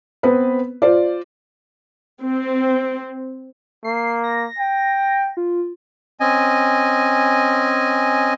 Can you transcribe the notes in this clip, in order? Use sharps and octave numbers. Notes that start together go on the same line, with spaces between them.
B3 C4 B4
F4 C5 D5
C4
A#3 C7
A#6
G5
F4
C4 C#4 D#5 G#5